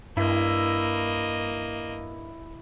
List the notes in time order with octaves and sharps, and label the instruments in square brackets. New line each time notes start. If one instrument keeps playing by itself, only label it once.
[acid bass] G2 [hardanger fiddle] A#3 D#5 [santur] E4